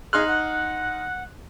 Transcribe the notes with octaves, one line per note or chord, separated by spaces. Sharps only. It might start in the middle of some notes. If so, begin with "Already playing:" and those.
D#4 G#4 C6 F6 F#6
F#5